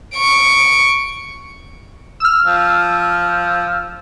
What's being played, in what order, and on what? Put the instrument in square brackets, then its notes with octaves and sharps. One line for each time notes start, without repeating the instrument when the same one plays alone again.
[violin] C#6 D7
[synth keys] E6 F6
[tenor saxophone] F3